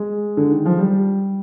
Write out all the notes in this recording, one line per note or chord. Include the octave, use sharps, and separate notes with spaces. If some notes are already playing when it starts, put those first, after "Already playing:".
Already playing: G#3
D3
D#3
F3
G3